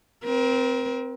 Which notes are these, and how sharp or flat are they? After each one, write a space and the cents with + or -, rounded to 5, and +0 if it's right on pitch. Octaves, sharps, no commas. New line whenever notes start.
C4 -10 A#4 +35